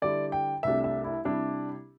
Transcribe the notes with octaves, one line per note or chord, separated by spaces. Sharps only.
D3 G3 E4 G4 D5
G5
C2 C3 A3 D4 G4 E5
E5
E4
C3 G3 D4 E4 G4